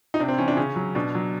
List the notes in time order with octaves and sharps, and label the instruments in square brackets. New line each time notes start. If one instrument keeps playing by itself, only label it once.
[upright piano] D#4
C3 D4
C4
E3 C#4
D4
C#3 C#4
F#3
B2 D4
F#3